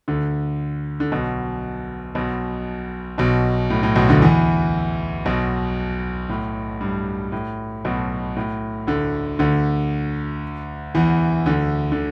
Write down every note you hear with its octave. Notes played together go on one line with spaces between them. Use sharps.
D2 D3
D3
B1 B2
B1 B2
B1 B2
A2
A2
B1 B2
D2 D3
E2 E3
B1 B2
A2
G2
A2
B1 B2
A2
D2 D3
D2 D3
E2 E3
D2 D3
D3